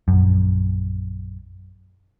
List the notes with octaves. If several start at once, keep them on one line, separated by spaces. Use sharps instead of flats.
A#1 F#2